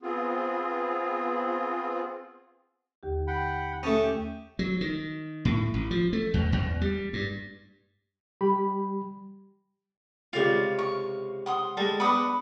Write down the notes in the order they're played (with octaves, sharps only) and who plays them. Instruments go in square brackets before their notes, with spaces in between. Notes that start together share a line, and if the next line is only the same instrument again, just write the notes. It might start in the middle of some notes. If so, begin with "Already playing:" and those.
[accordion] B3 C4 F4 G#4
[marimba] D#2 D3 G4
[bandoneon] F#5 G5 B5
[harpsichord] A3 C#4 [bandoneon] A5 D#6
[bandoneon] G4
[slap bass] F#3
D#3
A2
A1
F3
A3
E2
E2
G3
G2
[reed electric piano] G3 G4 B5
[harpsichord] C#2 C3 F5 [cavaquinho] F4 D5
[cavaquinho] C#6
F#5 C6 D#6
[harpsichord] G3 G#3 [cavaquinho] A4
[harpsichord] B3 D4 [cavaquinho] B5 D6 D#6